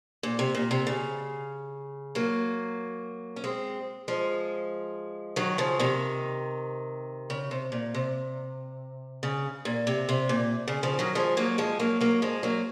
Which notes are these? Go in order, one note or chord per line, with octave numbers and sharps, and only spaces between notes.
A#2
C3
A#2
C3
C#3
F#3 A#3
C#4
G#3 C4
F3 G#3
D#3 F#3
C#3 F3
C3 D#3
C#3
C3
A#2
C3
C#3
A#2
C3
C3
A#2
C#3
C#3 F3
D#3 F#3
F3 G#3
F#3 A#3
F3 G#3
F#3 A#3
F#3 A#3
F3 G#3
F#3 A#3